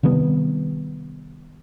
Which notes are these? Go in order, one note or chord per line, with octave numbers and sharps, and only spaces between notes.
C3 D#3 G3 B3